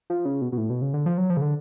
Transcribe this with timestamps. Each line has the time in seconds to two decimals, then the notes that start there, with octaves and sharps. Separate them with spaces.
0.10 F3
0.25 C#3
0.41 B2
0.52 B2
0.58 A2
0.70 B2
0.82 C#3
0.94 D3
1.06 F3
1.18 F#3
1.30 F3
1.37 C#3
1.42 D3